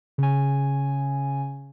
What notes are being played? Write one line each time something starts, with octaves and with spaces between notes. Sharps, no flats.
C#3 G#5